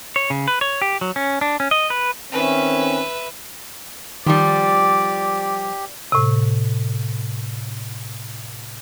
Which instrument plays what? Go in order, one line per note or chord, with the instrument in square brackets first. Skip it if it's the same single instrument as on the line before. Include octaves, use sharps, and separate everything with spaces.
[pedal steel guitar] C#5
C#3
B4
C#5
G4
F#3
C#4
D4
C#4
D#5
B4
[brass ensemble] D#3 C4 C#4 [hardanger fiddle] B4 E5
[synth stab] D#3 [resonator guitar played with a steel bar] F3 G3 [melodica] G4 [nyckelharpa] D5
[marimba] A2 C3